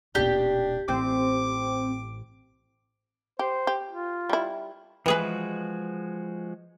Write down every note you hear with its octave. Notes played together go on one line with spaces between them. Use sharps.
D#1 B2 D4 G4
A1 C4 D6
G4 C5
G4
F4
G3 E4
E3 F3 G#3 F#4 G#4 B4